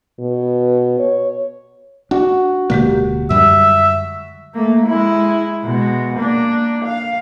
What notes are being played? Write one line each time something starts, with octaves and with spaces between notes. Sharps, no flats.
B2
C#5
D4 F#4
D1 B2 D3 G#3 A#3 G4
F#2 G3 E5
A3 A#3
G#3 E4
B2 G#3
A#3 D4
F5